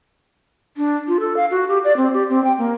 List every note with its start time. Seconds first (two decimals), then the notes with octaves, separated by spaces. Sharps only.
0.77 D4
1.08 F4
1.20 A4
1.37 F5
1.51 F#4
1.69 G4
1.84 D5
1.97 C4
2.14 G4
2.30 C4
2.44 G5
2.58 A#3